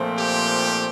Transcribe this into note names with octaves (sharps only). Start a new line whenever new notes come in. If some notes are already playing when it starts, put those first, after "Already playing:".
Already playing: A#2 F3 A3 C4
G4